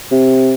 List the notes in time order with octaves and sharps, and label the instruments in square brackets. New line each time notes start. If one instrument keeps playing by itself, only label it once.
[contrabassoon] C3